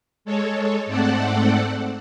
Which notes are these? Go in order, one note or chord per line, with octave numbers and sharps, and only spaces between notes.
G#3 A4 C#5
G#2 A3 C4 A4 D5 F#5